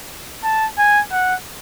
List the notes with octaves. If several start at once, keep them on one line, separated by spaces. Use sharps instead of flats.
A5
G#5
F#5